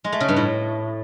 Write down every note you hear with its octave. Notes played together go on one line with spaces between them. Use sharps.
G#3
A3
C#3
G2
A2